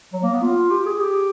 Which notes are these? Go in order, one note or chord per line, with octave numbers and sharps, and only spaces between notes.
F#3
A#3
B3
F4
G4
G#4
G4